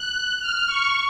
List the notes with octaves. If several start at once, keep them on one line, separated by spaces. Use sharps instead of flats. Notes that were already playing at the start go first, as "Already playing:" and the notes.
Already playing: F#6
F6
C#6